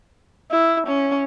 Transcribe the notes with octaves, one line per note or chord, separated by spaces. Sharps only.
E4
C#4